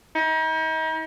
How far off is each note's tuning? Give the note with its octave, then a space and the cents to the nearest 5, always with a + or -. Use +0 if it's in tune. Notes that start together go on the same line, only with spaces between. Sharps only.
D#4 +40